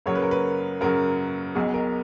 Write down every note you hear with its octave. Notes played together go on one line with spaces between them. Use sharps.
F#2 C#3 F#3 A#3 C#5
B4
A#4
B4
F#2 C#3 F#3 A#3 A#4
B1 B2 F#3 G#4
A#4